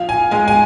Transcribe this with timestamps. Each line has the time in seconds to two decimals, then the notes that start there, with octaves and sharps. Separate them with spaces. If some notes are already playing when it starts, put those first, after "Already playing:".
Already playing: F3 F5
0.09 G#5
0.31 G#3 G#5
0.48 G#5